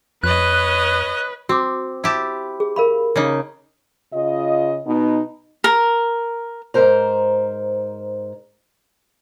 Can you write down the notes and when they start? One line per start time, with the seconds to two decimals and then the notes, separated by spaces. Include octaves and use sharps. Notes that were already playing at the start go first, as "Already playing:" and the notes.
0.24 F2 B4 C#5 D#5 F#6
1.49 C4 F#4 D6
2.04 E4 G4 A5
2.60 G#4
2.76 A#4 F5 B5
3.16 C#3 A#3 D#4
4.14 C#3 F4 D#5
4.87 B2 B3 D#4
5.64 A#4
6.74 G#2 B2 A#4 C5 A#5